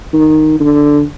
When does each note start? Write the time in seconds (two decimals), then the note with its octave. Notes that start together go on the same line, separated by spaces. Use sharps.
0.13 D#3
0.60 D3